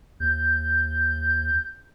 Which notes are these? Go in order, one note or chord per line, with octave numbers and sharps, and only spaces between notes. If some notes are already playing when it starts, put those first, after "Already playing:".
D#2 G6